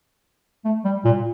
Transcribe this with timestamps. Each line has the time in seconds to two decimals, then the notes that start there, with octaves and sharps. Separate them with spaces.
0.65 A3
0.85 G3
1.05 A#2